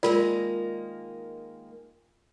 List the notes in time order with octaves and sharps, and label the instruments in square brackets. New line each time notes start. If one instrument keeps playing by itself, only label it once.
[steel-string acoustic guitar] D#3 G#3 A#3 [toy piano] F4 A#4 D5